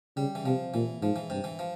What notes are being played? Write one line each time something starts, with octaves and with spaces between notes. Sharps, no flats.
C#3 G3
E3
C3 F3
A#2 E3
G#2 F3
E3
G2 C3
E3
F3